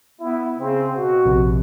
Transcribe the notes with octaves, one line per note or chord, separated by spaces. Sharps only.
B3 E4
C#3 C4
B2 F#4
A#1 C3